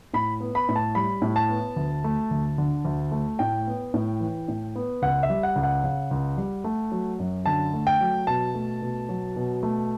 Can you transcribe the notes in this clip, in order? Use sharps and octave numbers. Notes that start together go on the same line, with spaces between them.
A2 B5
B3
B5
A2
A5
G3 B5
A2
A5
B3
D2
A3
D2
D3
D2
A3
A2 G5
B3
A2
E3
A2
B3
C#2 F#5
E5
G3
F#5
C#2
F#5
C#3
C#2
G3
A3
F#3
F#2
D3 A5
A3
G5
F#3
B2 A5
A3
B2
F#3
B2
A3